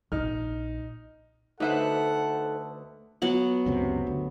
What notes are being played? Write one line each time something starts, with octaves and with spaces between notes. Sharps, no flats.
A#1 D#4 F6
D2 D#4 A4 B4 C5 E5 F#5
F#3 B3 F#5
C#2 F#2 C3
D2